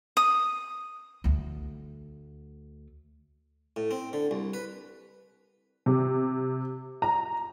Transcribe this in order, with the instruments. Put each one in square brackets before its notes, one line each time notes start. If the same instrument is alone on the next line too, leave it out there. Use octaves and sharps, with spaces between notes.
[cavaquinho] D#6
[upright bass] D2 A3
[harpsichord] A2
C4
D3
C2
B4
[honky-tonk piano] C3
A#5